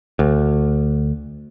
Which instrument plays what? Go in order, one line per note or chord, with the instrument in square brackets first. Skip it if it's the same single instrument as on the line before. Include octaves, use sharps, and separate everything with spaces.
[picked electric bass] D2